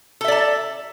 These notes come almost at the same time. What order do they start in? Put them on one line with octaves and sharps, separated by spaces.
A4 E5 D5 A5